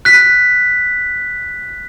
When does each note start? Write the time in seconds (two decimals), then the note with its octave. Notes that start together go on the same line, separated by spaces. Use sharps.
0.05 F#6 B6